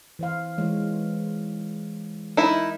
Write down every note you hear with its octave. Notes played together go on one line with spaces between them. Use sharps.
E3 C5 F5
E3 G#3 C#5
D#4 E4 A#4